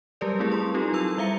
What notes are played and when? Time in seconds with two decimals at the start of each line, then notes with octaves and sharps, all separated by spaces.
0.21 F#3 G3 G4 A#4 B4 D5
0.39 A3 C4 E4 G#4 A#4
0.52 C6
0.74 C4 D#4 F4 G4 A4
0.92 F#3 E4 A#5 E6 F7
1.18 G3 E5 F5 A#5 C#7